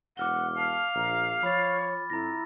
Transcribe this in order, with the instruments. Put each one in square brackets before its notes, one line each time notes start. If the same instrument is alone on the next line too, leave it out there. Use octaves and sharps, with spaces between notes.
[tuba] E1 [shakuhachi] F#5 [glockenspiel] D6 F6 G7
[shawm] F5 [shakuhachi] A5
[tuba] A#1 [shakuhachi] A#5
[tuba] F3 [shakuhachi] C#5 [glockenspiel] B5 A6
[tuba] F2 [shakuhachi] E4 [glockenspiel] A#5 A#6